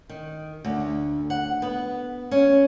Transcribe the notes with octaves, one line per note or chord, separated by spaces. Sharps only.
D#3
D2
F#5
B3
C#4